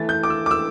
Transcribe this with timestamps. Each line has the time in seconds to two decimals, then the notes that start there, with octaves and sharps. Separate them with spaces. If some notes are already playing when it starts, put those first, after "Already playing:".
Already playing: E3 A3 E4 A6
0.09 G6
0.23 D6
0.30 E6
0.46 D6
0.51 E6